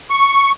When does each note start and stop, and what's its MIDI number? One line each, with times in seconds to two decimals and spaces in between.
0.10 0.52 85